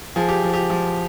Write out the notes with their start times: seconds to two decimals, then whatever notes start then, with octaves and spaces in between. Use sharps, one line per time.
0.16 F3 G#4
0.29 G4
0.43 F3
0.54 G4
0.70 F3